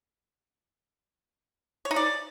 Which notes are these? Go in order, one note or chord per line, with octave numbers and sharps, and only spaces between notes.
C#5
D#4
D5